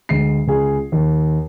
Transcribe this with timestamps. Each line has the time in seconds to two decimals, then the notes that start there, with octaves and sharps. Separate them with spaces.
0.09 D2 G#3 C7
0.47 C#2 G#4
0.92 D#2